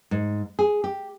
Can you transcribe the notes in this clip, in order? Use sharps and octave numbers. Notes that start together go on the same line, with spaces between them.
G#2
G#4
G4